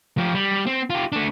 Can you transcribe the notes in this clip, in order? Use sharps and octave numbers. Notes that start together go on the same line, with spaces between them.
F3 G4
G3
C4
F4 G4
A3 D4